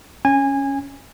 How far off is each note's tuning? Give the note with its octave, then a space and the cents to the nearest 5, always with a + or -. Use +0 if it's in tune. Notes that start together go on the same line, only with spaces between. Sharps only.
C#4 +0 G#5 -20